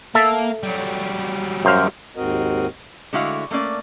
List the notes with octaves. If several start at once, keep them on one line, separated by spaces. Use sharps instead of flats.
A#3 A4 E5
F#3 G3
F#2 C5 F5
D#2 G#2 C4 F#4 A#4 D#5
D3 G#3 A3 E4 F#4 F5
A3 A#3 C#4 D5